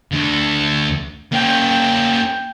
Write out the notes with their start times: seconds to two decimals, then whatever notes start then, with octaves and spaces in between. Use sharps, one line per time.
0.12 D2 D3
1.33 A#3 C#4 G5